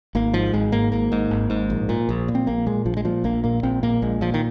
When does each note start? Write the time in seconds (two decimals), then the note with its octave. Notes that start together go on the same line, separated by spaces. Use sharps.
0.15 G#1 A#3
0.34 G#2 F3
0.53 G#1 G#3
0.72 G#2 A#3
0.92 G#1 A#3
1.12 G#2
1.31 G#1
1.50 G#2
1.70 A#1
1.89 A#2
2.09 A#1
2.28 A#2
2.35 C4
2.47 A#1 A#3
2.66 A#2 G#3
2.85 A#1 F3
2.97 G#3
3.05 A#2 F3
3.24 A#1 A#3
3.44 A#2 A#3
3.63 A#1 C4
3.83 A#2 A#3
4.02 A#1 G#3
4.21 A#2 F3
4.34 D#3